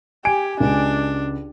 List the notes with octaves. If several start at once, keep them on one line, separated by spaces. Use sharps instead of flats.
G4 G#5 D7
C#2 D4